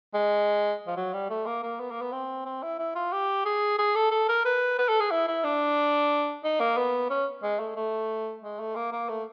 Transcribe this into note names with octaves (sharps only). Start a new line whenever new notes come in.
G#3
F3
F#3
G3
A3
A#3
A#3
B3
A#3
B3
C4
C4
E4
E4
F4
G4
G#4
G#4
A4
A4
A#4
B4
B4
A4
G#4
E4
E4
D4
D#4
A#3
B3
C#4
G#3
A3
A3
G#3
A3
A#3
A#3
A3